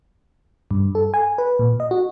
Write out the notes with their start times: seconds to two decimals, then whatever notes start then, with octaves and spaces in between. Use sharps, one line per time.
0.71 G2
0.95 A4
1.14 G#5
1.38 B4
1.59 A#2
1.80 D#5
1.91 F#4